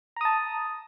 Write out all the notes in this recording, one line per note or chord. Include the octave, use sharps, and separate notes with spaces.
A5 A#5 D#6